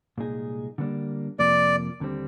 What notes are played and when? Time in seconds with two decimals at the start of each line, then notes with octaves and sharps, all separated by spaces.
0.18 C2 A#2 G#3 D#4 G#4
0.78 D3 G3 A#3 D4
1.39 F2 C3 F3 A#3 D5
2.00 D#2 D3 G3 C4